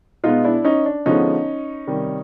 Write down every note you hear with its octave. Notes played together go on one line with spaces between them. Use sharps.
B2 G#3 B3 D#4 F4
D4 E4
C#4 D#4
D4
D3 F3 G#3 B3 C#4 D#4
C3 D#3 G3